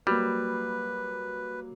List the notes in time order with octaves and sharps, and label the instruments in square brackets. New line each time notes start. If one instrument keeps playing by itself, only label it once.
[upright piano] F#3 A#3 [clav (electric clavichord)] G3 [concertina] B4